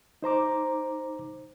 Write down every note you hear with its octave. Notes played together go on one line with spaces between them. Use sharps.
D#4 C5 A#5 D6